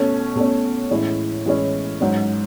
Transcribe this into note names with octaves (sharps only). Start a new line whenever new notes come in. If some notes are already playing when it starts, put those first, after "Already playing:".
Already playing: B2 A3 C#4
B2 A3 C#4
A2 E3 G#3 C#4 E4
A2 E3 G#3 C#4 E4
G#2 F#3 C#4